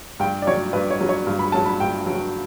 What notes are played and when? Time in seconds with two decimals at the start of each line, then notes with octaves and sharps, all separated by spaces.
0.20 G2 G5
0.42 D5
0.47 F#3 C#4 C#5
0.73 G2 B4
0.91 C#5
1.01 F#3 C#4
1.09 C#5
1.27 G2
1.39 B5
1.52 F#3 C#4 A5
1.66 B5
1.80 G2 G5
2.06 F#3 C#4